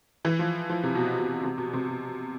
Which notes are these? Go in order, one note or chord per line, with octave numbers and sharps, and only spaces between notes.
E3
F3
F3
C3
B2
B2
C3
B2
C3
B2